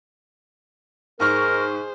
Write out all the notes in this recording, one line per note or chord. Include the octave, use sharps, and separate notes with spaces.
G#2 G#4 A#4 C5 C#6 F6